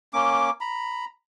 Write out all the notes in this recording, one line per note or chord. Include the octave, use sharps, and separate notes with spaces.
A#3 C#4 D6
A#5 B5